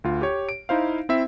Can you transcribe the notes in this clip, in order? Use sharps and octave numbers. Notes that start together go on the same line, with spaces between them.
D2 F4
G4 C#5
D7
D#4 E4 C5 F5
C4 E4 E5